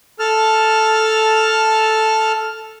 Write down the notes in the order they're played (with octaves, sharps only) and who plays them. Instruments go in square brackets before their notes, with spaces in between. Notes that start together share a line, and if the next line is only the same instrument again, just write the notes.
[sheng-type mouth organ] A4 A5 F6